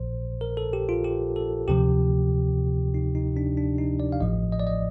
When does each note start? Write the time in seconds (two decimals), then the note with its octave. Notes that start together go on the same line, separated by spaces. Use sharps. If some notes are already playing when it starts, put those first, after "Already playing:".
Already playing: A#1 A#2 F3 C5
0.41 A#4
0.57 A4
0.73 G4
0.89 F4
1.04 G4
1.36 A4
1.68 D2 C3 F3 G4
2.94 D#4
3.15 D#4
3.37 D4
3.57 D4
3.78 D#4
4.00 D5
4.12 F5
4.20 A1 A2 F3 D#5
4.52 D#5
4.60 D5
4.67 D#5